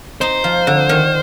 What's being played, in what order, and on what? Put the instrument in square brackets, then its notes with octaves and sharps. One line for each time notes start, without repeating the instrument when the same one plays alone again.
[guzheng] D#4 [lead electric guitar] C5
[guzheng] F3
D3
D#3